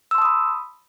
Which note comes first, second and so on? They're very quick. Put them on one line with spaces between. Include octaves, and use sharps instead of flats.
E6 C6 A5 D#6 B5